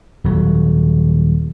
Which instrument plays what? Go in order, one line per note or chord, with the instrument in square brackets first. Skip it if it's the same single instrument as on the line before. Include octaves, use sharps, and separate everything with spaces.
[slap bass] D#1 F#3